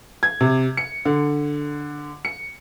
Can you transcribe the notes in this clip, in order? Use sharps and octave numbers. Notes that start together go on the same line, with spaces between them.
G#6
C3
C#7
D3
C#7